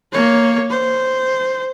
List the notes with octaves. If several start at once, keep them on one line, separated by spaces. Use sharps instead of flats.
A#3 C#5
C5